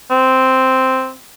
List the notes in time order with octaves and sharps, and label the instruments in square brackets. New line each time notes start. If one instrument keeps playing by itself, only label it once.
[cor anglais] C4